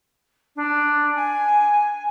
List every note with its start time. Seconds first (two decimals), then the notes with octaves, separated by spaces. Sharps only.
0.56 D4
1.15 G#5